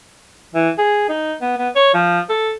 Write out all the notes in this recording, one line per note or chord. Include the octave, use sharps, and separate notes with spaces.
E3
G#4
D#4
B3
B3
C#5
F3
A4